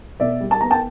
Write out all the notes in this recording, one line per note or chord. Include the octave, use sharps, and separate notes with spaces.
B2 D5 E5
G3
A5
B3 A#5
G5 A5